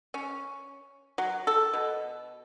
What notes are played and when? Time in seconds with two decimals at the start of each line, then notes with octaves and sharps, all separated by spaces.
0.14 C#4
1.18 F#3
1.47 A4
1.73 B2